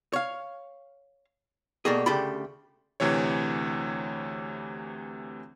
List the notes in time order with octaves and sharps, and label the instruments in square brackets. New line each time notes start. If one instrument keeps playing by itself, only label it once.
[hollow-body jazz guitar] C#5 F5
B2 G3 A3 A#3 G#4
D2 C#3 G4 A4 G5 B5
[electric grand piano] D2 C3 E3 C#5